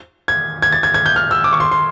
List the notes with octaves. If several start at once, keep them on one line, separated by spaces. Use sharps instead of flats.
G#6
G#6
A6
G#6
G#6
G6
F6
E6
D6
C#6
C6
C6